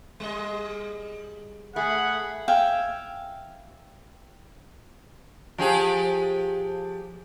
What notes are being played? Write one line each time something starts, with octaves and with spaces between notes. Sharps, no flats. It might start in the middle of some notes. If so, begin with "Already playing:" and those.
G3 G#4 D#5
A3 G#4 F#5 B5
E5 F5 G5 G#5
F3 G4 G#4